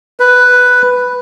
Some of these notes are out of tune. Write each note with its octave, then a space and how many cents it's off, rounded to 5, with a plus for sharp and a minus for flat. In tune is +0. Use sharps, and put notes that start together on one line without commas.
B4 +5